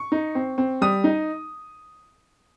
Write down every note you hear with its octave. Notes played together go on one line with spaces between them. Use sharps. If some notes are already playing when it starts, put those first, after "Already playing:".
Already playing: C#6
D#4
C4
C4
G3 D#6
D#4